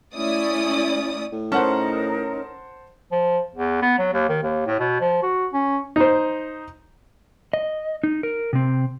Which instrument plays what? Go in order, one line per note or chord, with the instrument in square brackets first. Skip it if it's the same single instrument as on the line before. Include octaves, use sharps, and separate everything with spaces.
[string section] A3 C#4 E4 D5 D#6
[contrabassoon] A2
[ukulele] C#4 [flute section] D#4 A4 A#4 [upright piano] C5 F#5 A5
[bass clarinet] F3
E2
B3
F#3
D#2
D#3
D#2
A2
B2
F3
F#4
C#4
[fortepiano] D#4 C5
[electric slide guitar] D#5
D#4
A#4
C3 C4